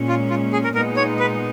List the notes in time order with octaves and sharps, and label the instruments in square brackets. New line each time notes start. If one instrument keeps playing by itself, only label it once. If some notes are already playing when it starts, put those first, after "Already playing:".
Already playing: [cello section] A#2 G#3 C#4
[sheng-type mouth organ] F4
F4
G#4
A#4
[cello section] A#2 G#3 B3 D#4 [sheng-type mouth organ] A#4
[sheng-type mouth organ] C#5
B4